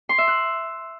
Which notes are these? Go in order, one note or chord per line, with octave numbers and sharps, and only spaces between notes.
C6
E5
F#6